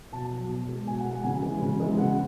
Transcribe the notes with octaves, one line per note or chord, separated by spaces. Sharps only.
B2 A5
F#3
B2
G#3
B2 G#5
F#5
G#3
F#5
C#3 G#5
E3 G#3
C#3
E3 G#3
C#3 F#5